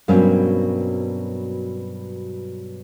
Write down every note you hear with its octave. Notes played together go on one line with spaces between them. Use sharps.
G2 B2 F#3 A#3 C4 C#4